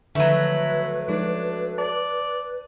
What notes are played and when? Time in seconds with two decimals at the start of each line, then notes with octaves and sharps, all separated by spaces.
0.15 D3 D#3 F3 F#3 A3 E4 B4
1.08 F3 G#3 D4 D#4
1.78 D5 A5